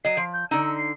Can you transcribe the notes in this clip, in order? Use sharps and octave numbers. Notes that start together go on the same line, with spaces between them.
F#3 D#5 C7
F3
G6
D3 D#4 E6
C7